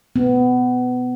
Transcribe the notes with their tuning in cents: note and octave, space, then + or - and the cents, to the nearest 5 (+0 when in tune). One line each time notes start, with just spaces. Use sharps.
B3 +20